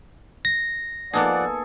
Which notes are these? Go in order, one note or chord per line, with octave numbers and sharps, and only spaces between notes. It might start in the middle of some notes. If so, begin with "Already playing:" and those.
A#6
F3 A#3 B3 D#4 G#4 A4 D5 F#5